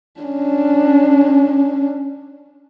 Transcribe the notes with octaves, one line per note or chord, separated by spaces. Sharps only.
C#4 D4